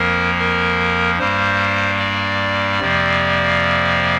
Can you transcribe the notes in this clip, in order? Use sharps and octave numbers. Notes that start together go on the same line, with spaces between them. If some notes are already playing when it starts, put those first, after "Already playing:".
Already playing: F2 F3 A#3 A#4
A#4
G2 G3 A#3 C5
D5
F2 C3 F3 A#3